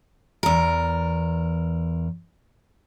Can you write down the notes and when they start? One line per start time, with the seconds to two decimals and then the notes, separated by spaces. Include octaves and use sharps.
0.43 E2 A#4